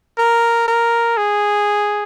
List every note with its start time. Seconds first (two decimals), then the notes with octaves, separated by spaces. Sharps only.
0.18 A#4
0.68 A#4
1.17 G#4